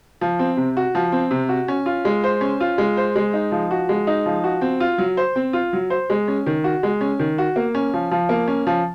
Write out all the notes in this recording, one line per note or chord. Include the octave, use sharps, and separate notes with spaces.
F3
C4
C3
F#4
F3
C4
C3
F#4
C#4
F4
G#3
C5
C#4
F4
G#3
C5
G#3
D#4
F3
F#4
G#3
D#4
F3
F#4
C4
F4
F#3
C5
C4
F4
F#3
C5
G#3
C#4
D#3
F#4
G#3
C#4
D#3
F#4
A#3
C#4
F3
F3
A#3
C#4
F3